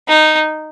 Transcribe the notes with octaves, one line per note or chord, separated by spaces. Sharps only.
D#4